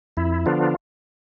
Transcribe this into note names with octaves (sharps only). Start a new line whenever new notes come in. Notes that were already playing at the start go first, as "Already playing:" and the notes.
F2 E4
D3 F3 B3 D4 F4